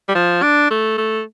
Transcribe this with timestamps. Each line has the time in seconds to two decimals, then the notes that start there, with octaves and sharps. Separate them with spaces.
0.09 G3
0.15 F3
0.42 D4
0.70 A3
0.98 A3